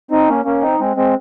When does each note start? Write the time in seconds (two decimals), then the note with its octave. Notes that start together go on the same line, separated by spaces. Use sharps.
0.11 C4 D#4
0.28 A#3 C#4
0.45 A#3 C#4
0.62 C4 D#4
0.80 G#3 C4
0.96 G#3 C4